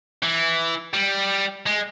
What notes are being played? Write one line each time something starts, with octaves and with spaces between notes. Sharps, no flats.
E3
G3
G#3